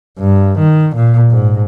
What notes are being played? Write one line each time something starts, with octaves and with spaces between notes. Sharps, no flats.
G2
D#3
A#2
G#2